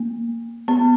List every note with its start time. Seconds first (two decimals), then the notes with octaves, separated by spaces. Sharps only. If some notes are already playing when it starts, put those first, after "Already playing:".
Already playing: A#3
0.68 B3